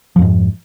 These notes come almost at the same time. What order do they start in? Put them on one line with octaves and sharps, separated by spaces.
F3 F2 G#2